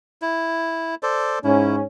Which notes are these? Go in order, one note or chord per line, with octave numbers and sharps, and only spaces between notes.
E4
A4 C5 D5
G#2 C#4 E4